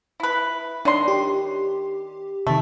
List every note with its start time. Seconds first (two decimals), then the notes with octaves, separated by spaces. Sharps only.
0.20 E4 B4
0.85 D#3 D4 C#5 D5 C6
1.08 G4
2.47 C3 D#3 A3